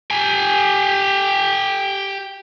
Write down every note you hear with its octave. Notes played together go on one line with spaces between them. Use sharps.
G4 G#5